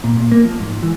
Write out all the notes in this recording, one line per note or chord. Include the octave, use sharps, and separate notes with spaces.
A#2
A#2
A#3
F3
G#2
E3